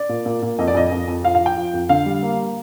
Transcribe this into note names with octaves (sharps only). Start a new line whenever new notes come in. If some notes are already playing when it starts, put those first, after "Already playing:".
Already playing: D5
A#2
A#2
A#2
F2 D#5
D5
F2 D#5
F2
F2
F3 F5
F5
F3
G5
F3
F2
D3 F5
G3
A#3